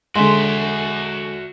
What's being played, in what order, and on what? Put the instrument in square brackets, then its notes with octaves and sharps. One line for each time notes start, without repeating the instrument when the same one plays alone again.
[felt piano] D3 G#3 [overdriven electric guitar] F#4 E5 [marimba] C6